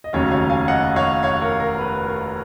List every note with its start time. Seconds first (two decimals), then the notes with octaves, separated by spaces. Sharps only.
0.04 D#5
0.13 F1 D#2 C#3 F#3 C#4 C#5 F5
0.31 C#5 F5
0.50 F5 G#5
0.68 D#5 F#5
0.96 C#5 F5
1.23 C#5 F5
1.41 A#4 C#5
1.60 A#4
1.78 B4
2.06 A#4